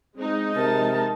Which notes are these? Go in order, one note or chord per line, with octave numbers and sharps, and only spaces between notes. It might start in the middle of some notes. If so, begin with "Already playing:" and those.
G#3 C4 D#4
C3 A#4 A5